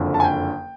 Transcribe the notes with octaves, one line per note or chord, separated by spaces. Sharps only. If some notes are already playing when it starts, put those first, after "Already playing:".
Already playing: F#1 F2 D3
A5
G#5
G5